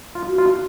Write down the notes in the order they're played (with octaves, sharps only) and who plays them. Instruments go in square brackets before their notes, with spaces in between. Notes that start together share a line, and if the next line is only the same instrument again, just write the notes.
[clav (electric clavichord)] F4
[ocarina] F#4
[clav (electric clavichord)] F4